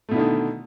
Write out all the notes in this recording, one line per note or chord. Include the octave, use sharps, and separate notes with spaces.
B2 D3 D#3 A3 E4